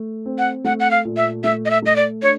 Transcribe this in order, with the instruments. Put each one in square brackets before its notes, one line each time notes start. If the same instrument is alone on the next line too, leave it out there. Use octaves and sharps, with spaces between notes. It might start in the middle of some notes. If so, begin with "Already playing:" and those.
Already playing: [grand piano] A3
C4
[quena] F#5
[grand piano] A3 [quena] F#5
[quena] F#5
F5
[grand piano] A#2
[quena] E5
[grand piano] A3 [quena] E5
[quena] D#5
E5
[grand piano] A3 [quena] D#5
[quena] D5
[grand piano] D4 [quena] C#5